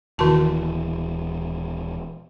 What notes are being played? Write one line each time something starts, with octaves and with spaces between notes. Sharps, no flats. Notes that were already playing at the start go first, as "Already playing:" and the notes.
D#1 D#3 E3 F#4 A5